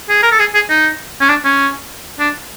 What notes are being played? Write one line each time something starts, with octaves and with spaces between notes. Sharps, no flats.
G#4
A#4
A4
G#4
G#4
D#4
C#4
D4
C#4
D4